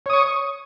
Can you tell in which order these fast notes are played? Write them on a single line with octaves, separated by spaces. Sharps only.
C#5 D#6 C#6